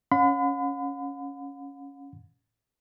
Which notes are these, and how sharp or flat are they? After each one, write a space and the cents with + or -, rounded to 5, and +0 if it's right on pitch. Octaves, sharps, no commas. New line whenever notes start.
C#4 +0 F#5 -45 B5 +40